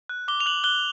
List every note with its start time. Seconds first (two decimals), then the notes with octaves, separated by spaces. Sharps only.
0.09 F#6
0.28 D6 G7
0.40 F7
0.46 F#6 F#7
0.64 F#6 G7